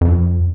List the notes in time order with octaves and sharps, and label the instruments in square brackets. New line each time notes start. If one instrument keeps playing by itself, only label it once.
[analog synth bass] F2